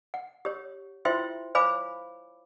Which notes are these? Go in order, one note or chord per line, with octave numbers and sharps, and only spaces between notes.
F#5
G4 C#5
E4 F4 C5 E5 G5 C6
C5 C#5 F5 G#5 B5 D6